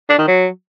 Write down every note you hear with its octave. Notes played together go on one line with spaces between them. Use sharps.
D4
D#3
F#3